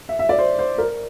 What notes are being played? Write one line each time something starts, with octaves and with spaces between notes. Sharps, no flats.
E5
E5
D5
C5
C5
A#4